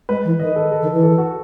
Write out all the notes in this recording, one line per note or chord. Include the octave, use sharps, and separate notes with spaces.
G#3 B4
E3
D#3 D#5
A4
A4
D#3
E3
A4
F#4